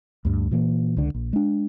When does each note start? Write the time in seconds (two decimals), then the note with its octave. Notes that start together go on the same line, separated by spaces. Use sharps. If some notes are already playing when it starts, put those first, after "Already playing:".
0.25 D2 G2
0.51 A#2 E3 A#3
0.97 C#2 D3
1.14 A#1
1.33 G#3 D4